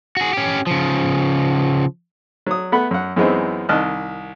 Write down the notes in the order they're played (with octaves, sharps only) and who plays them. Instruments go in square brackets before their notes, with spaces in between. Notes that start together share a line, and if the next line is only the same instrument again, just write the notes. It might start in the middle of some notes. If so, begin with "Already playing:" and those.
[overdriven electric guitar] F#4 G#4
C#4 G4
C#3 F3
[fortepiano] F#3 D#6
A3 B3 F#5 B5
F#2 F#5
F#2 E3 G#3 B3 C4 D#4
C2 D#3 D#5 A5 F6 F#6